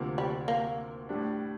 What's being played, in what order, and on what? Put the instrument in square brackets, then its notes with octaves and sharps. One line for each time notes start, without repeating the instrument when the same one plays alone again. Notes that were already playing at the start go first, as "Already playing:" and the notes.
Already playing: [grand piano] D2 C3 F3 A#3
[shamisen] G3
A#3
[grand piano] A2 G3 D4